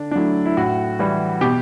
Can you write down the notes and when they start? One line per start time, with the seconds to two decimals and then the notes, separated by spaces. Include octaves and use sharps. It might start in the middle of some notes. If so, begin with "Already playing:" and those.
Already playing: D3 D4
0.11 D4
0.15 F#3 A3 E4
0.45 E4
0.57 A2 F#4
0.99 E3 G3
1.41 B2 G4